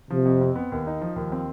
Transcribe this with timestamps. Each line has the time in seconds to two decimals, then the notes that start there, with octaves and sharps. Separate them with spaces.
0.10 C3 F3
0.25 F2
0.41 C4
0.56 B3
0.72 D#2
0.87 D#4
1.01 F3
1.16 D#2
1.32 C4